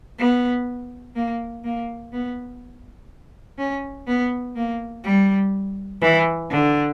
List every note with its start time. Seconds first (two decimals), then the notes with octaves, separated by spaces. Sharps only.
0.19 B3
1.16 A#3
1.64 A#3
2.13 B3
3.58 C#4
4.07 B3
4.56 A#3
5.04 G3
6.02 E3
6.50 D3